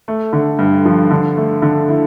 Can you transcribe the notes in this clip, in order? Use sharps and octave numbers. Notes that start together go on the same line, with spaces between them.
A3
D3
G2
F3
D3
A3
D3
E4